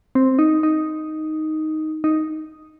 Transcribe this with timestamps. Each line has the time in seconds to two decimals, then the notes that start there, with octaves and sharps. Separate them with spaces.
0.15 C4
0.39 D#4
0.63 D#4
2.04 D#4